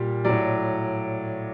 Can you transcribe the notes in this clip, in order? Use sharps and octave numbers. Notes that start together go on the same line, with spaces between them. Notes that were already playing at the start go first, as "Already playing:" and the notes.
Already playing: A#2 G3
A2 F#3 D5